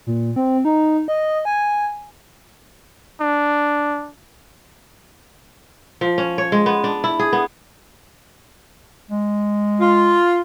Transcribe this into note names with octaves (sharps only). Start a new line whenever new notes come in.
A#2
C4
D#4
D#5
G#5
D4
F3
C#4
C#5
G#3
B3
D4
E4
G#4
B3
G#3
F4